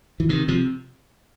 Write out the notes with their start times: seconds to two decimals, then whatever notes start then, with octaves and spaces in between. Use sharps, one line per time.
0.20 E3
0.29 C3 D#3
0.48 C3 F3